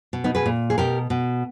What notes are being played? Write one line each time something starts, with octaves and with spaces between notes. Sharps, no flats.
B2
B3 D#4
G#4 B4
A#2
G#4
B2 G4 A#4
B2